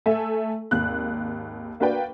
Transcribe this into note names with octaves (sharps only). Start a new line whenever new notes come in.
A3 A4 E5 G#5
G#1 D#2 F#6
A#3 D4 F#4 B4 D5 G5